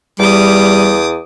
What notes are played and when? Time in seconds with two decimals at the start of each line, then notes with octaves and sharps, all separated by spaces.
0.19 E2 G3 D6 D#6